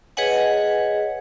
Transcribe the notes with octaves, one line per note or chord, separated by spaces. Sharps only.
G#4 B4 C#5 D#5 F#5 G#5